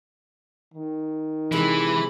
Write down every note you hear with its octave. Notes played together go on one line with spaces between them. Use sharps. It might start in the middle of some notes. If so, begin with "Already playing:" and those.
D#3
C3 E3 G#3 C4 B5